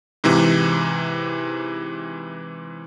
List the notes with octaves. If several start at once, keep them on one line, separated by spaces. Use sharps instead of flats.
G#2 C3 E3